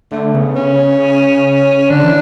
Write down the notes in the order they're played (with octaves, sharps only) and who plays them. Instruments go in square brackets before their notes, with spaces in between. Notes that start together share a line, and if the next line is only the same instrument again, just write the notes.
[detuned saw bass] D3 [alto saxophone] A3
[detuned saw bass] C#3 [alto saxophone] B3
[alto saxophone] C#4
[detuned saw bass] D3 [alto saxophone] D4
[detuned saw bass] E3